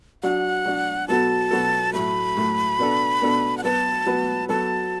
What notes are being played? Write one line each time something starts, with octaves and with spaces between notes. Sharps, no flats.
F#3 D4 F#4 F#5
F#3 D4 F#4
B2 F#3 B3 F#4 A4 A5
B2 F#3 B3 F#4 A4
A2 F#3 A3 B5
A2 F#3 A3
B2 B3 D4 A4
B2 B3 D4 A4
F#5
F#3 B3 F#4 B4 A5
F#3 B3 F#4 B4
F#3 B3 F#4 A4 A5